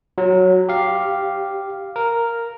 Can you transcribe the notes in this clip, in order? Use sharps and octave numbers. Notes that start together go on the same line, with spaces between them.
F#3
G4 F5
A#4